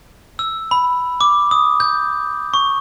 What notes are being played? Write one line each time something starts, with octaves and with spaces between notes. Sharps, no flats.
E6
B5
D6
D#6
G6
C#6